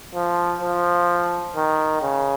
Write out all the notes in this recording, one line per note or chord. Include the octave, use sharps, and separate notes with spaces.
F3
F3
D#3
C#3